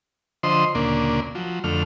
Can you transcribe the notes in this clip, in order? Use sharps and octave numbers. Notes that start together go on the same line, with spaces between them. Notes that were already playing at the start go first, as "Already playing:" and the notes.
D3 F3 C5 D#5 C6
D2 A#2 C#3 A#3 D4
F3 F#3
F2 D3 A3 F6